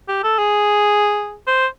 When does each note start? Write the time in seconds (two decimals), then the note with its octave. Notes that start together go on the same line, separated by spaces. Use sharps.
0.08 G4
0.23 A4
0.38 G#4
1.47 C5